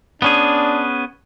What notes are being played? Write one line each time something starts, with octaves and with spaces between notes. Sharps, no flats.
B3 C#4 D4 G#4